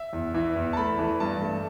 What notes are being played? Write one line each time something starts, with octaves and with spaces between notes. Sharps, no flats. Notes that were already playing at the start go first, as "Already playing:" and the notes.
Already playing: E5
E2
E3 E5
E2
A5
A3 B5
E3
G2 A5
A3